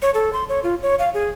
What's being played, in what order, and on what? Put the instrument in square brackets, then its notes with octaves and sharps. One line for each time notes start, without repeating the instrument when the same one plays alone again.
[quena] C#5
A4
C6
C#5
F4
C#5
F5
G#4